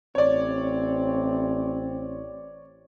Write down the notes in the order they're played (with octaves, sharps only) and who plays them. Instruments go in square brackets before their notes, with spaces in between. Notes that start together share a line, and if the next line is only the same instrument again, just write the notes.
[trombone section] A1 C4 [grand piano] C#5 D5